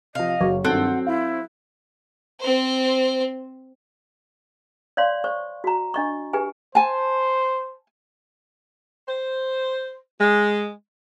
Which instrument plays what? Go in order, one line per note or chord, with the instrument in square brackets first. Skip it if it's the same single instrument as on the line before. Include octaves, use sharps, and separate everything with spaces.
[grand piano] C3 F3 [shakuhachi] D#5 [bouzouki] F5
[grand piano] F#1 [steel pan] F#3
[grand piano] G2 D#3 F#6 [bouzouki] C4 [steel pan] A4 [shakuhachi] F#5
[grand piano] F#4
[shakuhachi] E4 [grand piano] F5
[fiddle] C4 C5
[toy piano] C#5 D5 F5 C6
C5 C#6
F#4 A#5
D4 D#5 C#6
G4 B4 G#5
[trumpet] C5 [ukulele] G#5 A5
[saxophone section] C5
G#3